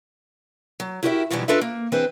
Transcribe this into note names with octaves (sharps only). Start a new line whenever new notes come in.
F#3
E4 F#4 G4 A#4 C#5 E5
F2 B2 D3 E3 F#3 G3
D4 F4 A4 B4 D#5 E5
A#3
E3 C4 D4 G#4 B4 C5